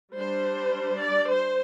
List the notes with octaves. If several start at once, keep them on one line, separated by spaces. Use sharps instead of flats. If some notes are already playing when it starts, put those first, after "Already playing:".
G3 D4 C5
D5
C5